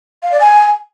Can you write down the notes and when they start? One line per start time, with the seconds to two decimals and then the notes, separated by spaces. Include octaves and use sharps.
0.23 F5
0.31 D5
0.40 G#5